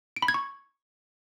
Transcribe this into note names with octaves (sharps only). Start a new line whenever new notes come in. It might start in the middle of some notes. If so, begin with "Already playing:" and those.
D7
B5
G#6
C#6